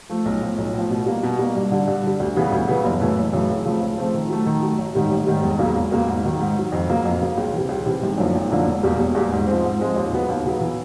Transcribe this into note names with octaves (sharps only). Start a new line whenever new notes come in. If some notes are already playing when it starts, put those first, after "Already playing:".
F3 A3
B1
A2 F3
B1
A2 F3
B2
G3 A#3
B2
G3 A#3
G2
D3 G3
G2
D3 G3
D2
C#3 E3 G3 B3
D2
C#3 E3 G3 B3
F#1
F#2 C#3 E3 A3
F#1
F#2 C#3 E3 A3
C#2
C#3 F3 A3 C4
C#2
C#3 F3 A3 C4
D#3
F#3 A3
D#3
F#3 A3
A1
G#2 D#3 G3
A1
G#2 D#3 G3
E1
E2 C#3 F#3 A#3
E1
E2 C#3 F#3 A#3
G#2
D#3 F#3
G#2
D#3 F#3
F2
C#3 F#3 A#3
F2
C#3 F#3 A#3
C#2
C3 E3
C#2
C3 E3
G#1
F#2 D3 F3 A#3
G#1
F#2 D3 F3 A#3
E1
E2 B2 G3 A#3
E1
E2 B2 G3 A#3
G#2
F3 G#3 C4
G#2
F3 G#3 C4
D#2
C#3 F#3 B3
D#2
C#3 F#3 B3
E3